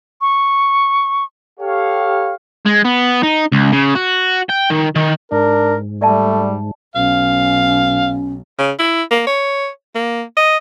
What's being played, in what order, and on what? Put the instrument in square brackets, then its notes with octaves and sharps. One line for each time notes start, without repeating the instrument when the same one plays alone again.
[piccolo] C#6
[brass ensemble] G4 A4 C#5 F5
[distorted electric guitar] G#3
B3
D#4
C#2
C#3
F#4
G5
D#3
D#3
[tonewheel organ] G#2 [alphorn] D4 [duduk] A#4
[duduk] G3 [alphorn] A3 [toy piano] D5 E5 A5
[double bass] B1 [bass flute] C#4 [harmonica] F5
[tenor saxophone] C#3
E4
A#3
C#5
A#3
D#5